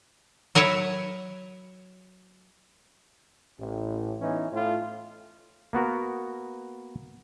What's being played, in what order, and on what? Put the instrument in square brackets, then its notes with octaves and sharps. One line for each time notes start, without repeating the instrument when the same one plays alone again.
[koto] F#3 A#4 B4 C#5 E5
[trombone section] A1 A2
E3 B3 C#4 D#4
A2 F4
[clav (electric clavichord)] A#3 B3 F#4 A#4